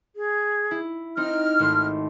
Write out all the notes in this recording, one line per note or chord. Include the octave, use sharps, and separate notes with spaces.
G#4
E4
C4 D#4 F6
G#1 A3 C6